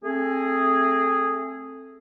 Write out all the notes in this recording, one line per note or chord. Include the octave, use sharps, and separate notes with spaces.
A3 C4 G#4